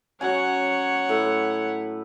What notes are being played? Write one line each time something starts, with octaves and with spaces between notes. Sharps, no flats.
F#3 C#4 C#5 F#5 G#5
A2 B4